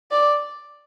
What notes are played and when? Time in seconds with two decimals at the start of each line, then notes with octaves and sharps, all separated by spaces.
0.11 D5